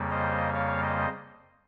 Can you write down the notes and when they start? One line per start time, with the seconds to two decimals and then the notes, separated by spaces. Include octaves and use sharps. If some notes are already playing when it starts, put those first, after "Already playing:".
Already playing: F2 C#3 G3 A#3
0.10 C5 D#5
0.54 C#5 F5
0.82 C5 D#5